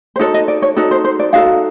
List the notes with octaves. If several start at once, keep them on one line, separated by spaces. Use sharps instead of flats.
C5
D#4 F#4 A4 C#5
D#5
D5
C#5
D#4 F#4 A4
C5
C5
D5
D#4 F#4 A4 F5